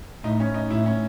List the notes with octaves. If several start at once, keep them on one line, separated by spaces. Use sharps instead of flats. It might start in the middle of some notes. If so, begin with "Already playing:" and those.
A2 D#4
C#4
D#4
A2 E4
C#4